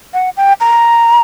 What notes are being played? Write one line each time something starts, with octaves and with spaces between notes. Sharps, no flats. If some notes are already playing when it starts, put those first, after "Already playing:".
F#5
G5
A#5